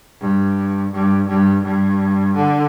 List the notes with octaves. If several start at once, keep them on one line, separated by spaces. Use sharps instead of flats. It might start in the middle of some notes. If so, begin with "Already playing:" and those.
G2
G2
G2
G2
D3